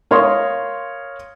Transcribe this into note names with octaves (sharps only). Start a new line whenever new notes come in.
A#4 C#5 F5 C6 D#6